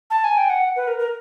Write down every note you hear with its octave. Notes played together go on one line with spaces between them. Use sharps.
A5
G#5
G5
F#5
B4
A#4
A#4